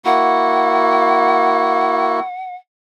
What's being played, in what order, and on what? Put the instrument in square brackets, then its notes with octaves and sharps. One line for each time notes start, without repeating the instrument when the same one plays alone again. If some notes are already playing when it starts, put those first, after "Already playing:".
[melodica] A#3 E4 F#4 [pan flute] F#5